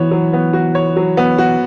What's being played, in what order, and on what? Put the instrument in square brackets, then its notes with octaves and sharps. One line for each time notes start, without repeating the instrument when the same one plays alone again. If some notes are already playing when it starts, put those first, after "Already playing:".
Already playing: [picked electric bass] E3 [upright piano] B3 F#4 C#5
[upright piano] F#3
B3
F#4
C#5
F#3
B3
F#4